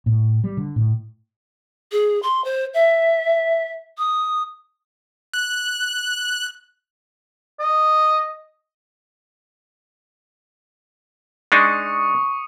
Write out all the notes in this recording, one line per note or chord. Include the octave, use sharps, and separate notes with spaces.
A2
G3
D3
A2
G#4
C6
C5
E5
D#6
F#6
D#5
G#3 D4 D#4 C#6 D#6 C#7